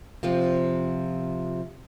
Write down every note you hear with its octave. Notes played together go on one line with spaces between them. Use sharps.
C3 F3 C4 F4